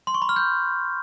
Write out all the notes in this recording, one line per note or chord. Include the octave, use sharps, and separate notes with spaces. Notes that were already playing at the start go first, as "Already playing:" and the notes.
C6
C#6
B5
F6
G6